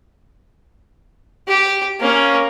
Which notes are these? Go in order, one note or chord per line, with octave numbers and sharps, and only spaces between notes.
G4
A#3 C#4